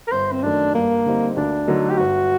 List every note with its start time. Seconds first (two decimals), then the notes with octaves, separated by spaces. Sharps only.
0.07 A#4
0.12 G1 C5
0.32 C4
0.43 F#2 D#3 A3 D4
0.74 G2 A#3
1.06 D3 G3 C4 D#4
1.37 D2 D4
1.67 D3 F#3 A3 D#4
1.90 G4
1.98 G1 F#4